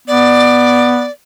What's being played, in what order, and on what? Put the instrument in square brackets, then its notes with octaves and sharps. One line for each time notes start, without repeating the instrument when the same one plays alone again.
[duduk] B3 [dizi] D5